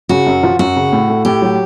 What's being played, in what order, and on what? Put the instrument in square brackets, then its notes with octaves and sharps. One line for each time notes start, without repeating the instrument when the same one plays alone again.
[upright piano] C#3 [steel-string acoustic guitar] F#4
[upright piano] F#2
F3
[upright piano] F#2 [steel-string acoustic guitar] F#4
[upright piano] C#3
A2
A3
[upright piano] A2 [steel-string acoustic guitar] G4
[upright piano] F#3